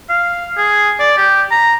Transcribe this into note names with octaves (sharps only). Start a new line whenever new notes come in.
F5
G#4
D5
G4
A#5